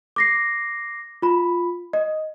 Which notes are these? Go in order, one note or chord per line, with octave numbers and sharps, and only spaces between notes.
D6 A#6 C7
F4 B5
D#5